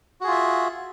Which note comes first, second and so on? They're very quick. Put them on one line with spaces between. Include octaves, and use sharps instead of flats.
F#4 G#4 F4 E5